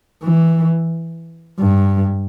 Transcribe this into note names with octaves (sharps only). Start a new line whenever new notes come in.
E3
G2